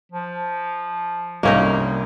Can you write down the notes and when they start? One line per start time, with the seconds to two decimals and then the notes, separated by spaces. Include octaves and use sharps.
0.12 F3
1.43 C2 G3 A#3 C#4 D#4 D#5